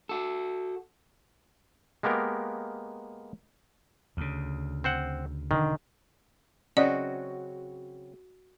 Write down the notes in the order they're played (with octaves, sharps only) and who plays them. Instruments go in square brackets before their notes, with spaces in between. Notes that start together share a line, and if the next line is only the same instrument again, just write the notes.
[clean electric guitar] F#4 A4
[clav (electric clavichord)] G#3 A#3 B3 G4 A#4
[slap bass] D2 C#3
[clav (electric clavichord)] C4 C5 F#5
[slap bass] E1 D3 D4 [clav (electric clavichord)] D#3
[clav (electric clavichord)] C#3 F#3 C4 [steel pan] C#4 D#5 [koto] F#4 [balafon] D5